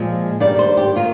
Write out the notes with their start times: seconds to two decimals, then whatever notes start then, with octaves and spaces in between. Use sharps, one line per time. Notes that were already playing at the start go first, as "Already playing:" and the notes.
Already playing: A#2 F3 G#3
0.40 G2 D#3 G3 D5
0.59 C5
0.77 G4
0.96 D#3 A#3 F4